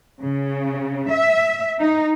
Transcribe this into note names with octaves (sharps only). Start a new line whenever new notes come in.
C#3
E5
D#4